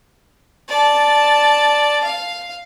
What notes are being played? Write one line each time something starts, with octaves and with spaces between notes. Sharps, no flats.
D5 A5
F5